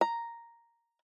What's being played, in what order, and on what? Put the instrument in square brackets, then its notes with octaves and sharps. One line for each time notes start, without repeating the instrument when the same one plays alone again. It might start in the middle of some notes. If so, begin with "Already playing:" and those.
[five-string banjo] A#5